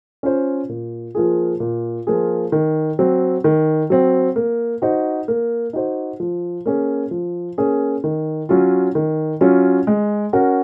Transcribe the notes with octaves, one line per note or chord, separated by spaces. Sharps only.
C#4 F4 C5
A#2
F3 A#3 F4 G#4
A#2
F3 A#3 F4 G#4
D#3
F#3 C4
D#3
F#3 C4
A#3
D#4 F#4 C5
A#3
D#4 F#4 C5
F3
A#3 C#4 G#4
F3
A#3 C#4 G#4
D#3
F#3 C#4 F4
D#3
F#3 C#4 F4
G#3
C#4 F#4 A#4